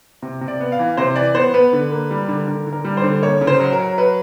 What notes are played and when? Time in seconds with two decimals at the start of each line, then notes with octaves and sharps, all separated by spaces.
0.22 C3
0.41 C3
0.48 D5
0.60 B3
0.72 F5
0.79 E3
0.97 C3 C5
1.16 E3 D5
1.35 B3 C5
1.54 B3 B4
1.73 D3
1.92 A#3
2.11 G3
2.28 D3
2.47 D3 A#4
2.67 D3
2.73 A#4
2.85 G3
2.97 C5
3.04 D3
3.22 A#3 C#5
3.41 C#3
3.47 C5
3.60 F#3
3.72 A#4
3.79 F#3
3.98 F#3 B4